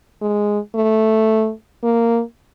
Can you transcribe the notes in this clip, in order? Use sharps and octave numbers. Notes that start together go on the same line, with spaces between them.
G#3
A3
A#3